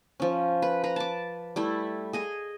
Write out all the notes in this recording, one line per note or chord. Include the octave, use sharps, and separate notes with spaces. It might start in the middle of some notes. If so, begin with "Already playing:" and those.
F3 C#4
B4
B4 A#5
A5 D6
G3 A3 E4
G#4 D#5 G#5